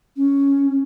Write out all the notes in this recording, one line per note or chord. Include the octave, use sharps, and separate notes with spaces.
C#4